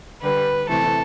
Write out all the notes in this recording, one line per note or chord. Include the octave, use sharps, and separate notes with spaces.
D3 G3 B4
C3 E3 A3 A4